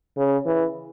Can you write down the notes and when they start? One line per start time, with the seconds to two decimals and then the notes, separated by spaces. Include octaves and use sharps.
0.17 C#3
0.45 E3